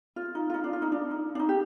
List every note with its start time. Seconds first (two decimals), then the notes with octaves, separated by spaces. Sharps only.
0.16 F4
0.35 D#4
0.50 F4
0.54 D#4
0.64 D4
0.73 F4
0.82 D#4
0.92 D4
1.11 D#4
1.35 D4
1.39 D#4
1.49 G4